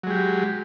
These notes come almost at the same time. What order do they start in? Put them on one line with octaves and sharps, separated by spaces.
F#3 G#3 G4